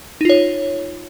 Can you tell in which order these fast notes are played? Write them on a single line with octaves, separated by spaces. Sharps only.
D#4 F4 C#5